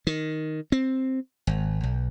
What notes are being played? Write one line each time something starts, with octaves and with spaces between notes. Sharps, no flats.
D#3
C4
G#1
B1